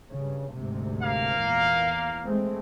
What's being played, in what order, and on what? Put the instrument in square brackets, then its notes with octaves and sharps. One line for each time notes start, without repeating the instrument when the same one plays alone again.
[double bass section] G2 C#3
D2 G#2 C3
[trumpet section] A#3 F5
[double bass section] E2 A#2
G#3 A3 C4